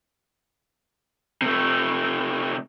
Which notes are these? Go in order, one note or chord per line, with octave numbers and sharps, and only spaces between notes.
C3 A3